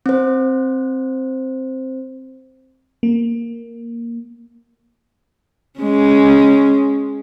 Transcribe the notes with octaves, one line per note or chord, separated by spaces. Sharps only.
C4 C5
A#3
G#3 C#4